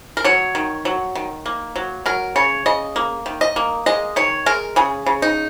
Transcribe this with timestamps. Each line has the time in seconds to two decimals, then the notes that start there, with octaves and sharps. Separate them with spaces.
0.17 A#4
0.24 F#3 C#5
0.55 D#3
0.85 F#3
1.15 D#3
1.46 A#3
1.76 F#3
2.06 F#3 A#4
2.36 C#3 C#5
2.66 C#3 D#5
2.96 A#3
3.26 D#3
3.41 D#5
3.56 A#3
3.86 G#3 D#5
4.16 D#3 C#5
4.46 G#3 A#4
4.76 C#3 G#4
5.06 C#3
5.22 D#4